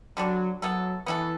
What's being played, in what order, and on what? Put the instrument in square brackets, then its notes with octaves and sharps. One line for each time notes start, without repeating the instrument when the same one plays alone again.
[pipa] D3 G3 D4 [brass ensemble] F#3
[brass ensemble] F#3 [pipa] B3 E4 A4
[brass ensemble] E3 [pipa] B3 E4 A4